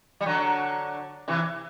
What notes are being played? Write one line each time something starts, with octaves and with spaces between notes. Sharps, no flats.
G3
D3 F#3
C3 E3